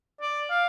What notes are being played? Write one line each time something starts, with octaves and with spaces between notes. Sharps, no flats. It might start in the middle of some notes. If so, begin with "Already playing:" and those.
D5
F5